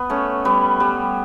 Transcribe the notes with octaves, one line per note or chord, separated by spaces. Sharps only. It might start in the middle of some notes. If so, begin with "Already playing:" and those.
Already playing: B3
A3 C#4
G3 B3
G3 B3